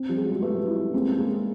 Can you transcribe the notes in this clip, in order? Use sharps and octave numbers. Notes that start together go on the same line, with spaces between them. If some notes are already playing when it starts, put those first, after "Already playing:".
Already playing: C4
F3 G3
G#4
F#3 G#3
G3 A3 B4
E4
G#3 A#3 C4
G#3 A#3 G#4